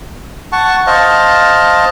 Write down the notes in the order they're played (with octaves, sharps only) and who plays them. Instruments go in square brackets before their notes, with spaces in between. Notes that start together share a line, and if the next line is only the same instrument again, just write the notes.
[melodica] F#5 A5 C#6
C5 D#5 F5 A5